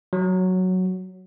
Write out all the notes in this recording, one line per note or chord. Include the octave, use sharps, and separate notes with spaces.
F#3